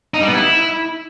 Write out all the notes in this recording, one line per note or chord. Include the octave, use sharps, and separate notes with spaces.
D#4
G3
B3
E4